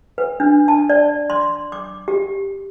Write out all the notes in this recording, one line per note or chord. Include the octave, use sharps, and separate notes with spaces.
B4
D4
A5
D5
C6
D6
G4